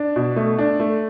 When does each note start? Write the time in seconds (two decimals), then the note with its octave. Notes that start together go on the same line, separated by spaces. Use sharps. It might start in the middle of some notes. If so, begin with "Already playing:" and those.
Already playing: D4
0.16 B2
0.36 A3
0.59 D4
0.80 A3